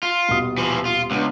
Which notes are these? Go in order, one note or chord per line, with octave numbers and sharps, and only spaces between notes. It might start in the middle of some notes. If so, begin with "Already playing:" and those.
F4
D#1 B2 D#6
E3 F3
F4
C#2 B3 D4